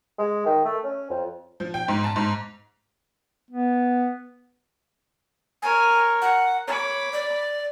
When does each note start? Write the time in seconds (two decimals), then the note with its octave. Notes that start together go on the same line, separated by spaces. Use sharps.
0.18 G#3
0.45 D#3
0.65 A3
0.84 C#4
1.10 F2
1.60 F3
1.74 G5
1.88 G#2
2.04 A5
2.16 G#2
3.50 B3
5.62 A#4 C#5 G#5
6.22 F#5
6.68 C#5 B5 D6
7.13 D5